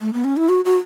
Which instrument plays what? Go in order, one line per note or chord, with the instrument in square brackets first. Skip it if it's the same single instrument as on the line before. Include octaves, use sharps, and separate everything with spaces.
[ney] A3
B3
C#4
E4
F#4
F#4